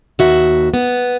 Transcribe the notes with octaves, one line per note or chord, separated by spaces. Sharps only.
D#2 F#4 E5
B3